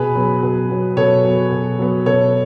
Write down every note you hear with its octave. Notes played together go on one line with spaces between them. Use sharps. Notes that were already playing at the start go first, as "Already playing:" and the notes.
Already playing: B2 G#4 B4
F#3 B3
B2
F#3 B3
B2 A4 C#5
F#3 B3
B2
F#3 B3
B2 A4 C#5